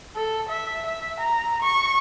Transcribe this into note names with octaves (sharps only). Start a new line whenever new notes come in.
A4
E5
E5
A#5
C#6